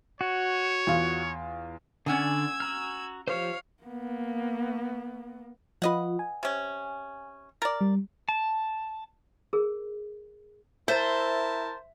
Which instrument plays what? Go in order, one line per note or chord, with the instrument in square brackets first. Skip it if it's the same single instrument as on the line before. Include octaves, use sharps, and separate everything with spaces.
[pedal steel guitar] F#4 [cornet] C#5
[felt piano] E2 F4
[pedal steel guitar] D3 D5 [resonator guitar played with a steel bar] C#4 F#5 G#5 [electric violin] E6 G#6
[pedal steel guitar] F#4 A#5 F6
[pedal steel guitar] F3 G4 C5 [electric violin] C#5 F5
[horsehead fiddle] A#3 B3
[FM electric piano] F3 F4 [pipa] B4 D#5 F#5
[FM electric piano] G#5
[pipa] C3 C#4
[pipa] A#4 D5 [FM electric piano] F6 A6
[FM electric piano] G3
[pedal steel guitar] A5
[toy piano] G#4 A#4
[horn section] E4 A#4 A5 [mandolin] C5 [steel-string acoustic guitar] E5